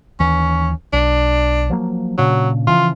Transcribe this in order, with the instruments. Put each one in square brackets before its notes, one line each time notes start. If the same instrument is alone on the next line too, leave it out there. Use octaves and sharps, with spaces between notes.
[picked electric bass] D#2 E3 [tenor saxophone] C#4
[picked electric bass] B1 [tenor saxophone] D4
[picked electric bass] F3 F#3 A#3
[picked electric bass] A#2 C#3 D4 [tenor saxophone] F#3
[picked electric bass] C#3 E3 F3 [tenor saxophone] F4